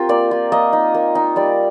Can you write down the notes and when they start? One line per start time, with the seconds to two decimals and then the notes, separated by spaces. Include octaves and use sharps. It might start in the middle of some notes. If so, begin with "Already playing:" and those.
Already playing: C4 F4 G4 A#4 G5
0.09 A#3 D5
0.31 F4
0.52 A#3 D#5
0.73 D#4
0.95 A#3
1.15 D#4
1.36 G3 D5